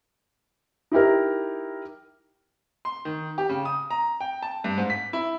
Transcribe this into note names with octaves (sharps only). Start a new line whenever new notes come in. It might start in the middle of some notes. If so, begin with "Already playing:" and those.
D#4 E4 G4 A#4
C6
D#3
G4
C#3
D#6
A#5
G5
A5
G2
G#2
B6
E4